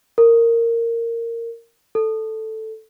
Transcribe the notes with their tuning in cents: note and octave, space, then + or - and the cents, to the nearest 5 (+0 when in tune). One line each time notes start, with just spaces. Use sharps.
A#4 -15
A4 +0